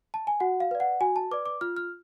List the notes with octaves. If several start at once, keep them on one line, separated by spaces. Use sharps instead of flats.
A5
G#5
F#4 F#5
F5
B4 D5
F#5
F#4 G#5
A5
B4 D5 D6
D6
F4 F6
F6